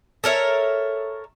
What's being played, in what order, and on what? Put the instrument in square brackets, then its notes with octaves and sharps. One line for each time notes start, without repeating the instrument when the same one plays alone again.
[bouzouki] A4 A#4 C#5 E5